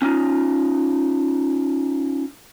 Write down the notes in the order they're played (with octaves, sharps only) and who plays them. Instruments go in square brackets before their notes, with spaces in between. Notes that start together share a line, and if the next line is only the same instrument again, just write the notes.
[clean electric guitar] C#4 D#4 F4